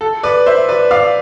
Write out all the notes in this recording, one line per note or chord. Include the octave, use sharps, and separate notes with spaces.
A4
B4 D5
C5 E5
B4 D5
D5 F5